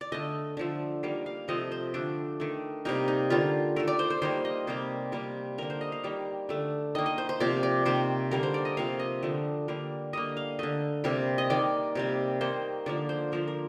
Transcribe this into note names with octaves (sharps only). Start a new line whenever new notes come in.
D5
D3 A3 D#5
D3 F3 A3
D#3 G3 A#3 F5
F5
C3 F3 A3 D#5
C5
D3 A3 D4
D#3 A3
C3 G3 A#3 D#4
D#4
D3 G3 A#3 F4
D#3 A3 A#4
D5
C5
C5
D#3 G3 A#3 C5
D#5
C3 G3 A#3 C5
C3 G3 A#3
D3 G3 A#3 A#4
C5
D#5
F5
D#3 G3 A#3
D3 A3
D#3 A#3 D#5
D#5
C5
C5
C3 F3 A#3 D5
D5
C3 D#3 A#3 C5
D3 G3 A#3 A#4
C5
D5
D#5
C3 F3 A#3 F5
D#5
D3 F3 A3
D3 G3 A#3
D3 G3 A#3 D#5
F5
D3 A3 D#5
C3 G3 A#3
D#5
D#3 A#3 D5
C3 G3 A#3
D#3 A#3 C5
D3 F3 A#3 D5
C5
D3 F3 A#3 A#4
A#4